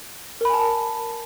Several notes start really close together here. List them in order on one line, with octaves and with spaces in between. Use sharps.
A#4 B5 G#5 A5